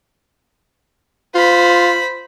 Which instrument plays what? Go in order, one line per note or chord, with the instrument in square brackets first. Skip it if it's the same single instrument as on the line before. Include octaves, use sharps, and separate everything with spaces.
[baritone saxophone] F4 [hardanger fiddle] C5 B5